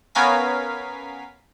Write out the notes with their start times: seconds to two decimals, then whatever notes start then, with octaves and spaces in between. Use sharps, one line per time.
0.15 B3 C#4 A#4 F5 G#5 B6